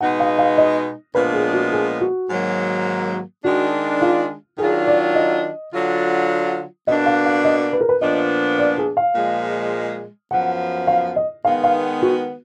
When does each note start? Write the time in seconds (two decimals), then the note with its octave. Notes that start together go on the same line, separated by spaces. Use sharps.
0.01 B2 G#3 B3 D#4 F#5
0.20 F5
0.39 F5
0.58 D#5
1.15 A#2 F3 G#3 B3 D4 B4
1.34 G#4
1.53 F#4
1.72 G#4
2.01 F#4
2.29 G#2 D#3 F#3 A#3
3.43 D#3 G#3 D4 F#4
4.02 F4
4.58 D#3 F#3 D4 F4 G#4
4.87 D5
5.15 D#5
5.72 D3 F#3 D4 F4
6.87 B2 A#3 D4 D#5
7.06 F5
7.26 F5
7.45 D#5
7.73 B4
7.81 A#4
7.89 B4
8.01 A#2 F3 B3 D4 D#5
8.59 D5
8.78 G#4
8.97 F5
9.15 A#2 F3 G#3
10.31 F#2 F3 B3 F#5
10.87 F5
11.16 D#5
11.44 D#3 G#3 B3 F5
11.64 F5
12.02 F#4